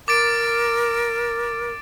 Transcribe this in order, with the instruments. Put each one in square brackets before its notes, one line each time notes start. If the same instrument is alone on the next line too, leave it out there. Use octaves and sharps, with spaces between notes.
[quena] A#4 [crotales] D6 A6 D7